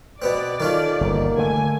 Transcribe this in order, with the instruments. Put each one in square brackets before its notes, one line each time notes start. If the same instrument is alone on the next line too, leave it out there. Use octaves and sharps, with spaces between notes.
[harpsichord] B2 B3 C4 [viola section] D5
[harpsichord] D#3 C#4 F4 [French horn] A4
[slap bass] G1 B2 [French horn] A#3
[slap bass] D3 A3 [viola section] G#5